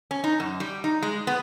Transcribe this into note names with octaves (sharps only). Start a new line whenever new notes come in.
C#4
D#4
F#2
G3
D#4
G#3
B3